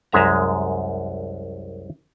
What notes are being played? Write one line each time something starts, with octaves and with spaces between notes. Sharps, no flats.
C2 F#2 G#3 E5 A#5